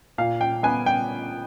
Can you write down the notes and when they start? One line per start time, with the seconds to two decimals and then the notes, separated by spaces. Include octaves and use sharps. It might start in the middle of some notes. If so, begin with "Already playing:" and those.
0.18 A#2 F5
0.41 G5
0.63 B3 G#5
0.86 G5